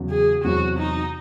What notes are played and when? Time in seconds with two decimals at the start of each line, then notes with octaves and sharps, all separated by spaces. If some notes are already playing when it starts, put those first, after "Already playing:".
Already playing: E2 C#3 F#3
0.10 G#4
0.44 E2 C3 F#3 F#4
0.78 D#4